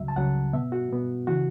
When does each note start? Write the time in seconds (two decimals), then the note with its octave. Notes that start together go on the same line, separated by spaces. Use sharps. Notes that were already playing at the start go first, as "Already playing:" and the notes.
Already playing: C#2 C#3 F#3 E5
0.08 A5
0.16 C#2 C#3 F#3 F#5
0.53 B2 B3 E5
0.72 F#4
0.89 B2 B3
1.27 C#3 E3 F#4